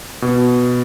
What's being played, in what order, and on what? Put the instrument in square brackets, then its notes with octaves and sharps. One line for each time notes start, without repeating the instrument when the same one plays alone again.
[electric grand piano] B2